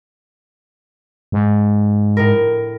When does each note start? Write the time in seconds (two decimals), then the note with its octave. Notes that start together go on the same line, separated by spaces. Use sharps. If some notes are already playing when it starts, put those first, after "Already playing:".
1.32 G#2
2.17 A2 A#4